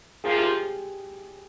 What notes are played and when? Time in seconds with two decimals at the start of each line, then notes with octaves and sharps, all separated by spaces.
0.24 C3 F3 A#3 F4 G#4
0.38 G4